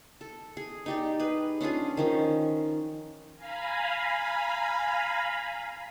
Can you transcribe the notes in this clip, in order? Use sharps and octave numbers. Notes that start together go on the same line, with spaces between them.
A4
G#4
D#4 G4 D5
G#4 B4
C#4 D4 F4 G#4
D#3 F3 C#4
F5 G#5 A#5 B5